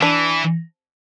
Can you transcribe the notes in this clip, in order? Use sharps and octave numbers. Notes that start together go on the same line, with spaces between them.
E3 D4